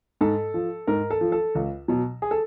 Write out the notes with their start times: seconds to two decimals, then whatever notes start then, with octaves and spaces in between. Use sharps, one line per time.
0.21 G#2 A4
0.54 F3
0.87 G#2 A#4
1.10 A4
1.21 F3
1.32 A4
1.55 C#2
1.88 B2 F#3
2.22 G#4
2.31 A4